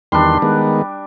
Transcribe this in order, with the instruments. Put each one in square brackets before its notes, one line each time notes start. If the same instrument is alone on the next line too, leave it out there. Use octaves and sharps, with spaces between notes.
[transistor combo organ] E2 D#3 C6 [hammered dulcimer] G3 D4
[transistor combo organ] D#3 G#3 B3